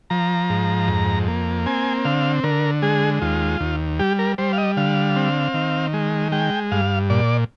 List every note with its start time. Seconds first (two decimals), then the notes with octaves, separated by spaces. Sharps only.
0.10 F3 A#5
0.50 G#2
0.88 F2
1.28 A#3
1.66 C4 G#5
2.05 D3 F5
2.43 D3 A#4
2.82 G#3 G#4
3.22 D#2 F4
3.60 D#2
3.99 G3 G4
4.19 A#4
4.38 G3 C5
4.53 F5
4.58 D#5
4.77 D3 F5
5.16 C4
5.54 D#3
5.93 G#3
6.32 G#3 G5
6.72 G2 F5
7.10 A#2 D5